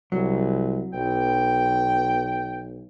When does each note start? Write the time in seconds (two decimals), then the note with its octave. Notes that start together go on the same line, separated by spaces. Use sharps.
0.12 C2 F#3
0.93 B1 G5